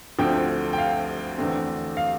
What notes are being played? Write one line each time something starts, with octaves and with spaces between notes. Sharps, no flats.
D2 D3 F3 A3 C4 G5
G5
F5
E2 D3 A3 C4
F5